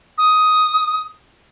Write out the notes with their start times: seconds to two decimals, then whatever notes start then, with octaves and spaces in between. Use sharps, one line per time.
0.18 D#6